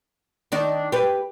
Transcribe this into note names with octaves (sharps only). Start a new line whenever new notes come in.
D#3 D4 D#4
G4 B4